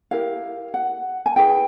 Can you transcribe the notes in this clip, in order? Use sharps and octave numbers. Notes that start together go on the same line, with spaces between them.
E4 G4 A#4 F5
F#5
G#5
E4 G#4 B4 G5